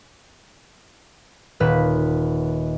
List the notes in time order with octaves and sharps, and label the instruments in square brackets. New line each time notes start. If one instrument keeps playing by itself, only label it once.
[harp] D#1 B4